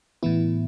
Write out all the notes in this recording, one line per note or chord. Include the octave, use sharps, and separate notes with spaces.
A2 E3 B3 E4